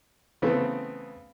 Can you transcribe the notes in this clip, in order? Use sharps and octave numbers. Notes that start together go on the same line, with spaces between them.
C#3 E3 A3 B3 C4